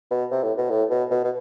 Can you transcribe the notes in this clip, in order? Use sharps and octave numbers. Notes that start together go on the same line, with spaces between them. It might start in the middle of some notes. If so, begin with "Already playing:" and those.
B2
C3
A2
B2
A2
B2
B2
B2